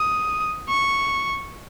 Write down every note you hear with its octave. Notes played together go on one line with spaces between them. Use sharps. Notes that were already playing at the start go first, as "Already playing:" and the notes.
Already playing: D#6
C#6